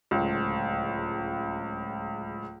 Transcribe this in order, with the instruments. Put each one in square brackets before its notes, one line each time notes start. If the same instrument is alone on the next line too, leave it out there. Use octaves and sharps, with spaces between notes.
[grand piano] D1 C#2